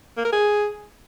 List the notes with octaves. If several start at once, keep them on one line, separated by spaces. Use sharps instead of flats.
A#3
A#4
G#4